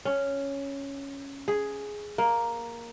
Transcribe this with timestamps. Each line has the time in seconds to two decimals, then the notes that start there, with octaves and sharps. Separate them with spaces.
0.05 C#4
1.48 G#4
2.18 A#3